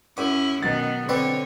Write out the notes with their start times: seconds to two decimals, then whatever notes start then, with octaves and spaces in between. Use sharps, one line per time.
0.17 F#2 C#4 E4 D6
0.63 B2 D#3 F#3 B3 A6
1.09 D3 C4 B4 C#5 D5